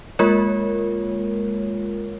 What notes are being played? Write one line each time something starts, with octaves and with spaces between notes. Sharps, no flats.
G#3 A#3 F4 A#4 C#5